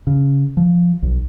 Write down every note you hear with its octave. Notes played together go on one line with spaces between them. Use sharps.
C#3
F3
B1